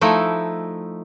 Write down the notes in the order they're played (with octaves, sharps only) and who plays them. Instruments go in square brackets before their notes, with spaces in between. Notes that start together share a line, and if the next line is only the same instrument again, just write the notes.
[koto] F3 A3 D#4 E4